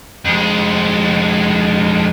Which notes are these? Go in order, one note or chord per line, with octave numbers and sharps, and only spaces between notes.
F2 G#3